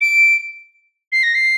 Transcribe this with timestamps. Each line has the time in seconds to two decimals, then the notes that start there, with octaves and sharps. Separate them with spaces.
0.01 D7
1.12 C7
1.23 A#6
1.35 C7